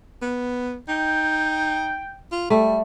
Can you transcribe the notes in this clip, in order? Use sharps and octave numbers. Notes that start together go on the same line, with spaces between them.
B3
D#4 G5
F4
G3 A3